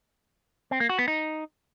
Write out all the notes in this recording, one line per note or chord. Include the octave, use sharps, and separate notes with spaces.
C4
A#3
F#4
B3
D#4